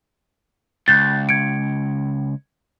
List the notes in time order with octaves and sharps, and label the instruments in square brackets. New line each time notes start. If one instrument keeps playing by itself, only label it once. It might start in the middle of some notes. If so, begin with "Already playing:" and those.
[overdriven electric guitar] C#2 [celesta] F#6 G6 A6
[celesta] G#6 C#7 D7